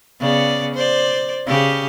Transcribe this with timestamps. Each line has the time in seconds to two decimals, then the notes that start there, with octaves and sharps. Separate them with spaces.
0.20 C#3 B3 D5
0.75 C5 D5
1.47 C#3 G4